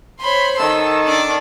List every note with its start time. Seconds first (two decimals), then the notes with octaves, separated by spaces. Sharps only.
0.21 C5 C#5 B5 C6
0.59 D#3 A4 E6
1.06 D4 D5